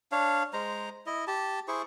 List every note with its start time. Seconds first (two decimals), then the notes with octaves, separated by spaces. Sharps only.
0.12 D4 C#5 F5
0.53 G#3 C5 A#5
1.06 E4 D#5
1.27 G4 A5
1.68 E4 G#4 C5 C#6